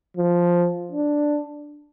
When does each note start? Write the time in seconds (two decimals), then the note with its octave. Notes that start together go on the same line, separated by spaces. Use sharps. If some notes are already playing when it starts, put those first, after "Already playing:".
0.17 F3
0.92 D4